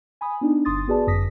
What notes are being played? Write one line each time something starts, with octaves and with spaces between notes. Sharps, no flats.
G#5 B5 D#6
B3 D4 D#4
G1 C6 D#6 A6
B3 F#4 G#4 B4 D5 A5
G1 F#2 D#6 A#6 B6